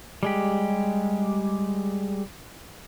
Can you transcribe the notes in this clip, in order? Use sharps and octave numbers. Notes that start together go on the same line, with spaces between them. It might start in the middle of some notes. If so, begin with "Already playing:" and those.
G3 G#3 G4